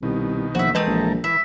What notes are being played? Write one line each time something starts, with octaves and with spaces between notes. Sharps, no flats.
C2 B2 D#3
A#1 F3 F#4 E5
E3 G#3 A3 C4 A4 A#4 D#6
A#1
E3 B4 E5